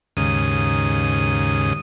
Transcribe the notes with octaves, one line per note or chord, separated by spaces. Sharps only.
D#2 G#2 C#3 D#6